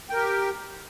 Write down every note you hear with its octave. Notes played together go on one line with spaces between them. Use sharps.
G4 A#4 G5